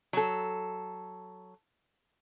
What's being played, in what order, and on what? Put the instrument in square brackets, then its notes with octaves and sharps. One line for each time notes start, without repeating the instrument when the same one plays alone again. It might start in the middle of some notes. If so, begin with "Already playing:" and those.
[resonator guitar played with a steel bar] F#3 A4